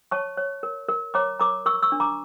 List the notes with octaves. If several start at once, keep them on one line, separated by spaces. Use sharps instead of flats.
C#5 A5 C#6
C#5
A#4
A#4
C#5 A#5 D6
A#4 A#5 D6
A#4 C#6 E6
C#6 E6
D4
A#5 D6